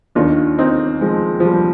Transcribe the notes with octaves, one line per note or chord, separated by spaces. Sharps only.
D#2 D#3 D4 F4
C4 D#4
F3 G#3
F3
G3